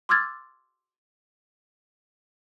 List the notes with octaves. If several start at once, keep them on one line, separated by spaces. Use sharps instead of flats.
C6 D6 E6 F6 G#6 A6